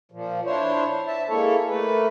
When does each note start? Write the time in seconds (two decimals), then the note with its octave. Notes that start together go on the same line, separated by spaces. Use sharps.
0.12 A#2 F3
0.45 D4 E4 C5 C#5
1.07 E5 A5
1.29 G#3 A#3 E4 A4 C#5
1.68 A3 A#3 B4